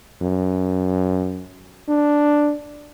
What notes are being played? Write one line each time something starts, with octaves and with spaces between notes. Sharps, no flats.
F#2
D4